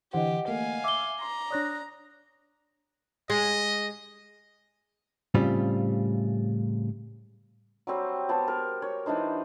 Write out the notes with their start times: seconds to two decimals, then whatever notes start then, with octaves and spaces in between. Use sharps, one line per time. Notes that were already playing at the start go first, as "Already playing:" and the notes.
0.13 D3 E3 G4 C5 D#5 F#5
0.48 A3 A#3 F5 G#5
0.84 E5 D6 G7
1.21 A#5 C6
1.50 D4 C#5 D5 D#6 F#6 A#6
3.30 G#3 D#5
5.34 A2 C#3 G3 C4 F4
7.87 F#3 G3 C4
8.29 B3 G4 C5 A5
8.48 A#4
8.82 C#5
9.06 E3 D4 D#4 C5